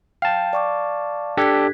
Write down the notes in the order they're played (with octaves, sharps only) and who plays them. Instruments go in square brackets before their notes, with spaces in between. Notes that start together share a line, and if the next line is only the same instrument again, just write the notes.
[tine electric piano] F5 A5 [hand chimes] G5
[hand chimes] D5 C#6 D6
[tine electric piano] D4 G4 A4 [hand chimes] F#6 G#6 B6